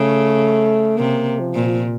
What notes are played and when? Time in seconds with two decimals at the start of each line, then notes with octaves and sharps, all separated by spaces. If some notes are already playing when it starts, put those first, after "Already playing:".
Already playing: C#3 A3
0.98 C3 A#3
1.40 F3
1.54 A#2